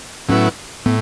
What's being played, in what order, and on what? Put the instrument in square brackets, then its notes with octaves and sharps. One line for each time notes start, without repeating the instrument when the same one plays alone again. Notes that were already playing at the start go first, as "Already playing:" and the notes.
[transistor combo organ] A2 F#3 B3 E4 [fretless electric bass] C#4
[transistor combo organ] A2 [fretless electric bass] B3